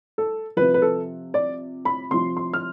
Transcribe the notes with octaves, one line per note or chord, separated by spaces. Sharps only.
A4
C3 F3 B4
B4
A4
D5
B5
C3 F3 C6
C6
F6